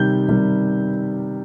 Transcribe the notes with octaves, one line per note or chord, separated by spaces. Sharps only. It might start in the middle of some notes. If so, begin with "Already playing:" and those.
Already playing: C3 D#3 G3 G6
C3 D#3 G3